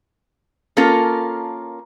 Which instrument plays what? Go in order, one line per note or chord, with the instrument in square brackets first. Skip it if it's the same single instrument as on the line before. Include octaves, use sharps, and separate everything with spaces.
[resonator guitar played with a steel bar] A#3 C#4 F4 A4 A#4